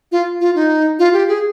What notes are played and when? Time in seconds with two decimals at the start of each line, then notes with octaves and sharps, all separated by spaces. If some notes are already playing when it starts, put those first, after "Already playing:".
0.12 F4
0.41 F4
0.55 D#4
0.99 F4
1.13 G4
1.28 G#4